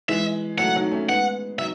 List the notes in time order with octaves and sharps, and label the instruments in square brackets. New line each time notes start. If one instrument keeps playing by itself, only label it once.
[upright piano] E3 G#3 [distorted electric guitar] E5
[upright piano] F#3 A3 [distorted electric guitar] F#5
[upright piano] D#3 F#3
A3 C#4
[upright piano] G#3 B3 [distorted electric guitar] F#5
[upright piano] D#3 F#3 [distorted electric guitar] E5